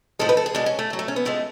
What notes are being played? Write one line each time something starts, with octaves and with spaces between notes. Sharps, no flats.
A2 F3 G#3 A4
B4
A4
G#4
B2 G#3 D4
C#4
A3
A2 F#3
A3
C#4
B3
A2 F3 G#3 A3